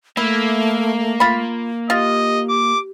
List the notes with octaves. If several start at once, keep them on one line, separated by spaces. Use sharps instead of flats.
A3 A#3 E4
F4 B5
F4 G4 D#5
D6